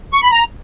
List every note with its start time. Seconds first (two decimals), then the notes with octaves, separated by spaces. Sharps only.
0.13 C#6
0.22 B5
0.31 A#5